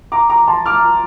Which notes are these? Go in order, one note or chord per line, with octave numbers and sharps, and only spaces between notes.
A#5 D6
A#5 D6
A5 C6
D6 F6